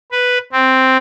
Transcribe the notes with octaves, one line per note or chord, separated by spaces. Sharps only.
B4
C4